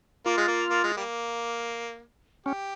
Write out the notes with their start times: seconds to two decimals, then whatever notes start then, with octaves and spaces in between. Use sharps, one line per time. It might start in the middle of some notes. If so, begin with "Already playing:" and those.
0.26 A#3 F4
0.37 G#3
0.47 A#3
0.70 A#3
0.83 G#3
0.97 G3 A#3
2.46 C#4 G4